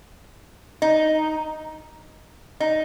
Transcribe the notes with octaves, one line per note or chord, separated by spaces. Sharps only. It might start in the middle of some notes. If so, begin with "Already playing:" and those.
D#4
D#4